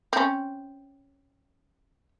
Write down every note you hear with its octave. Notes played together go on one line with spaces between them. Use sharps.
C4 C#4